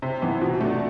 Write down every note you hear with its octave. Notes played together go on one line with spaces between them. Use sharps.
C3
E3 B3
B2
A3 D4